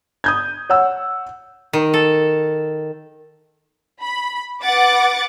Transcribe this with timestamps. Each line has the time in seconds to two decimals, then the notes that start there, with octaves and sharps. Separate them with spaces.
0.24 D#6 G6 G#6
0.70 C#5 F#5 E6
1.73 D#3
1.94 A4
4.01 B5
4.62 B4 F#5 D6 A6